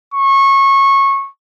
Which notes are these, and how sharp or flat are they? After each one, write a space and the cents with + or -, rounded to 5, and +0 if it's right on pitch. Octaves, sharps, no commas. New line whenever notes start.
C#6 -20